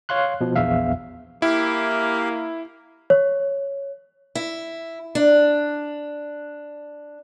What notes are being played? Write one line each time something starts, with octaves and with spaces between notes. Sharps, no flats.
C#5 F5 C6 F#6
B2 F3
A#1 E2 E5 F5
A#3 E4 G4 F5
C#5
E4
D4